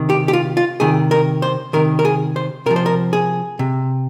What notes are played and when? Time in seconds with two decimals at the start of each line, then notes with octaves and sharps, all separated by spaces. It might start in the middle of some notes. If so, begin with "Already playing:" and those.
Already playing: C3 D#3
0.10 G4
0.28 G4
0.33 F4
0.57 F4
0.80 C3 D#3 G#4
1.11 A#4
1.42 C5
1.73 C3 D#3 A#4
1.99 A#4
2.05 G#4
2.36 C5
2.66 C3 F3 A#4
2.76 C5
2.86 A#4
3.13 G#4
3.59 C3